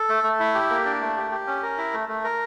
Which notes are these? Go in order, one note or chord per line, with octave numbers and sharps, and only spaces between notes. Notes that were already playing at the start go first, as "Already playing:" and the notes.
Already playing: A4
A3
A3
E4
G4
A#3
D4
A3
G4
G4
C#4
A#4
E4
A3
A3
A#4